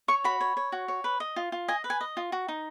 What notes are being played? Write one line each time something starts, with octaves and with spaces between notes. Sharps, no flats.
C#5 C#6
F#4 B5
C#5
C#5
F#4
C#5
B4
D#5
F4
F4
D#5 G#5
B4
G#5
D#5
F4
F#4
D#4